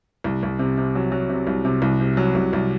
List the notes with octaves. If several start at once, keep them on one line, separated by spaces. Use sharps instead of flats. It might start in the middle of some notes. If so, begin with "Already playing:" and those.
C2
C2
C3
C3
F#3
F#3
C3
C2
C3
C2
C3
F#3
C2
C2